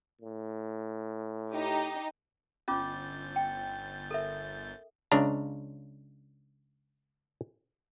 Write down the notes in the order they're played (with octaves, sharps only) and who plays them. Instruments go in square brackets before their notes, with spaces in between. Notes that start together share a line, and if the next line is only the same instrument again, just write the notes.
[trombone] A2
[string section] D#4 G4
[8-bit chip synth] G1 G6 A6 [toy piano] C#4 F4 D6
[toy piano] G5
A4 A#4 E5
[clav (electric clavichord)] C#2 C#3 D4 A#5